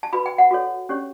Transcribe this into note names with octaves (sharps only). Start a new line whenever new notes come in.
A5
F#4 B4 B5
G5
F#5
F#4 A4 C#5
C#4 G4 C#5